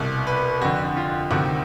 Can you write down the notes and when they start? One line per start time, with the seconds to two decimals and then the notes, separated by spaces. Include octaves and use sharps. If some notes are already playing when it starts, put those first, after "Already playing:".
Already playing: C2 B2
0.27 B4
0.61 F2 D3 F#4
0.97 F4
1.31 D2 C3 D#3 F#4